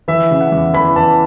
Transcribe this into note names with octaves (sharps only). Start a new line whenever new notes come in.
E3 E5
C#3
F#5
E2
E3 B5
E3 A5